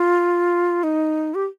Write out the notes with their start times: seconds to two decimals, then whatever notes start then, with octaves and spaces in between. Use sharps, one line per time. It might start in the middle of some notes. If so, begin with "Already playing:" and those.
Already playing: F4
0.83 D#4
1.35 G4